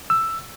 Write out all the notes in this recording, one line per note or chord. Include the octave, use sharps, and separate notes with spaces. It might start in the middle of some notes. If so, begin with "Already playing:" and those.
E6